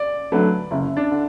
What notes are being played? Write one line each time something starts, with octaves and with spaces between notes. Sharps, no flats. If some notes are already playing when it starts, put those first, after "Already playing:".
Already playing: D5
D3 F#3 A3 B4
F#1 E4
D4
D3